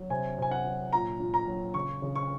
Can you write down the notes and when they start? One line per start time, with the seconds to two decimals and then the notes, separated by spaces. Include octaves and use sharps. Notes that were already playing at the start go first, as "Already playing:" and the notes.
Already playing: F#3
0.10 C3 G#5
0.38 C3 G#5
0.51 F#5
0.65 F#3
0.93 A#2 A#5
1.20 A#2
1.34 A#5
1.47 F#3
1.74 C#3 C#6
2.02 C#3
2.16 C#6